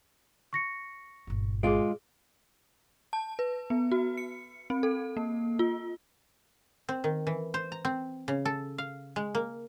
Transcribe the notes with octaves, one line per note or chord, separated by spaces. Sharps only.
C#6 A#6 C#7
G1 A#2
G#3 F4 G#4 D7
A5
B4
B3
F#4
C#7
C4
A4
A#3
F4
C4
D#3
E3
C5
A#5
C4
C#3
A4
F5
G#3
A#3